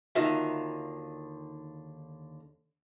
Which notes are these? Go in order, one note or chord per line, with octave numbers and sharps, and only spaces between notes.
D#2 D3 D#3 F4 F#4 E5